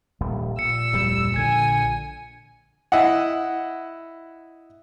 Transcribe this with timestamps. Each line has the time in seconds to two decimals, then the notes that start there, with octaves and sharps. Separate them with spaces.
0.21 D#1 A#1 G3
0.59 A#2 E6 C#7
0.93 D1 F2 G3
1.36 A#1 D3 G#5 G#6
2.92 E4 D#5 F#5